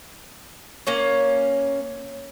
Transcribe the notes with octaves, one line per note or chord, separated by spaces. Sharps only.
A#3 C#4 C#5